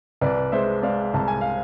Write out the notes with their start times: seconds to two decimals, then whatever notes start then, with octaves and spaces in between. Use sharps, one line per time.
0.21 C2 B4 D5
0.52 G#3 C5 E5
0.83 G#3 D5 F5
1.14 C2 A5
1.28 G#5
1.41 F5